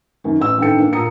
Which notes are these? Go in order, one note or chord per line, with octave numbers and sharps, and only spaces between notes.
F#2 D#3
A1 E6
A1 G2 D#3 A4 G5 C#7
A#3 D4
A#2 A#4 A#5 D#6 C#7